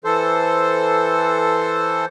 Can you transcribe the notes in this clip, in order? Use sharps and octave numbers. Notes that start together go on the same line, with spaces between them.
E3 A4 C5